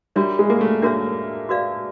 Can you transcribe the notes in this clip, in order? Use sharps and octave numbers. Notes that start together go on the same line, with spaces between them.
G3 D4 F#4 A#4 C#5 E5
G#3
A#3
A3
A#3 D4 F#4 A#4 C#5 E5
F#4 B4 D5 F5